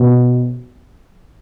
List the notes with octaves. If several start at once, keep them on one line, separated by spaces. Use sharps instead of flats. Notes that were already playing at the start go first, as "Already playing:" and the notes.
Already playing: B2